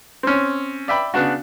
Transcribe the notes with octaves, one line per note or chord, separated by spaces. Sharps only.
C4 C#4
D5 E5 G5 B5
C#3 B3 D4 F#4